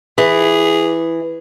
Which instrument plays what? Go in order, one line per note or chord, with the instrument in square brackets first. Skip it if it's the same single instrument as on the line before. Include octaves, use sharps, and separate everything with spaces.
[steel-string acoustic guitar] E3 [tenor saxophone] G#4